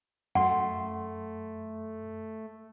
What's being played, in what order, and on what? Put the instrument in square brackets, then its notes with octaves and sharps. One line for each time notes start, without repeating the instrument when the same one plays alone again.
[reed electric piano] F#2 C6 [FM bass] A3 [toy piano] F#5